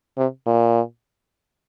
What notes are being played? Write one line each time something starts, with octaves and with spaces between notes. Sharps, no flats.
C3
A#2